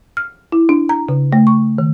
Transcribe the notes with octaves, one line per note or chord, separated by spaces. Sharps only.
F6
E4
D4
A#5
C#3
A3
C#6
D#3